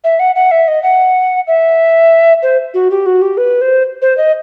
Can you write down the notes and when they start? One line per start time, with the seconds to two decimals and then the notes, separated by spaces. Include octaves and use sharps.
0.04 E5
0.19 F#5
0.35 F#5
0.51 E5
0.68 D#5
0.83 F#5
1.47 E5
2.43 C5
2.74 F#4
2.91 G4
3.06 F#4
3.21 G4
3.37 B4
3.61 C5
4.02 C5
4.17 D#5